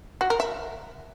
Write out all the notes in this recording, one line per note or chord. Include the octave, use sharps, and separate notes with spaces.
F#4
A#4
E5